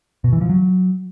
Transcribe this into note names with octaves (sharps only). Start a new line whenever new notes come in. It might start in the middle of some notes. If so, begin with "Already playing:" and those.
B2
E3
F3
F#3